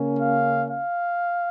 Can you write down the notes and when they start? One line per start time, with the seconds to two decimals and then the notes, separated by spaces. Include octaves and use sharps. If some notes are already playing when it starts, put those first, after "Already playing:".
Already playing: C#3 A#3 C#4
0.19 F5
0.70 F5